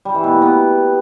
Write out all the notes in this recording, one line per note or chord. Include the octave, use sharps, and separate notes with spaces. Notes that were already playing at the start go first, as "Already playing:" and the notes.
G3
E3
B2
A#3
B3